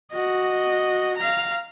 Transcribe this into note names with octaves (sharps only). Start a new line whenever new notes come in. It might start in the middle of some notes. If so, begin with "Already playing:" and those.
F#4 D#5
F5 A#5